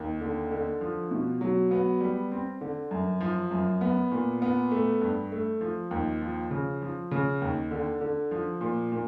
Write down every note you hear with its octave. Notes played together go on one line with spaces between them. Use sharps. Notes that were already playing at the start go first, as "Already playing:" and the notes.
Already playing: D#2
D3
D3
F3
B2
F#3
B3
G3
C4
D3
F#2
F3
F#2
B3
A#2
B3
A3
G2
A3
F3
D#2
F3
C#3
F3
C#3
D#2
D3
D3
F3
A#2
A#2